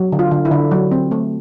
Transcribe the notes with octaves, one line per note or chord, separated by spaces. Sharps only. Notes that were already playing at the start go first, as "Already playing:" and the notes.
Already playing: F#3
D3
F4
D3
E4
D3
F#3
C4
A3